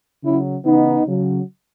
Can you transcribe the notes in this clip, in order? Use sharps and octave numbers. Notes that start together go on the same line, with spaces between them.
C#3 F#3 C#4 E4
C#3 E3 B3 D#4
C#3 F#3